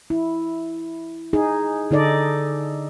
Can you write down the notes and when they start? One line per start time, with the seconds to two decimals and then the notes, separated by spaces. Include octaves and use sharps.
0.10 E4
1.33 D#4 G#4
1.91 D3 D#4 A4 D5 D#5